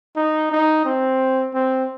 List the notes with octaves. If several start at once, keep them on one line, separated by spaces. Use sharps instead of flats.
D#4
D#4
C4
C4